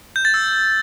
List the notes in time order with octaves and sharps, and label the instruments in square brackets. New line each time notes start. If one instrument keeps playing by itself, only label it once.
[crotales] G6
A6
E6